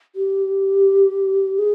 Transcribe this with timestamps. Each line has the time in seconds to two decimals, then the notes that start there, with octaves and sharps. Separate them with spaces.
0.15 G4
1.59 G#4